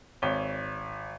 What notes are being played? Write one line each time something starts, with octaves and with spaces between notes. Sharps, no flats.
G#1 C#5 G7